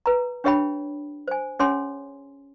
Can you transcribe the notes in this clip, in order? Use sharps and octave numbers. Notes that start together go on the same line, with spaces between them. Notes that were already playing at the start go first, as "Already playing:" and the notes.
B4 A#5
D4 G4 C#5 E5 G5 B5
C5 G#5
C#4 G#4 C#5 G#5 C6